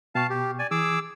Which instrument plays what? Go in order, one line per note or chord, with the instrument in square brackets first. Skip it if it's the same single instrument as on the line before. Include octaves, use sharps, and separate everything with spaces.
[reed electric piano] B2 G5 C#6 [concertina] F5 A5
[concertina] G4
D5 G#5
[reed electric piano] E3 [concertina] G#4 D6 E6